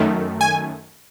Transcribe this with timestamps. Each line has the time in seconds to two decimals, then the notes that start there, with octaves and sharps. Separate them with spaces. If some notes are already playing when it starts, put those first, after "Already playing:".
Already playing: F#2 D#3 A3
0.41 G#5